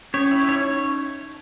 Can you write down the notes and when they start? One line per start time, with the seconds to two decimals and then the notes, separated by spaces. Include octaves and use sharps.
0.14 C#4 C#5
0.31 E4
0.48 D#4 C#5